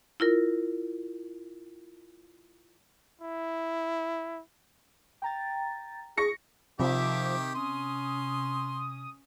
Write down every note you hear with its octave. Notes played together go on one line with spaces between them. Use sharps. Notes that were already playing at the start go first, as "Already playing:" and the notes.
E4 F4 A#4
E4
G5 A#5 A6
G#4 C#6 A#6 C#7
C3 D#3 F3 G4 E5 D6
C#4 C6 D#6